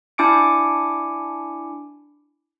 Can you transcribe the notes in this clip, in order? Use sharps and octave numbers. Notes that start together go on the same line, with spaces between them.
D4 E4 G#5 D6 C#7 D7